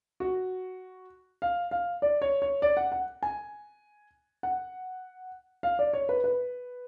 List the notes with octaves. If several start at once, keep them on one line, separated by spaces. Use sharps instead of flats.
F#4
F5
F5
D5
C#5
C#5
D5
F#5
F#5
G#5
F#5
F5
D5
C#5
B4
B4